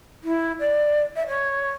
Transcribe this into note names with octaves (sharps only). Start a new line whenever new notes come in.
E4
D5
E5
C#5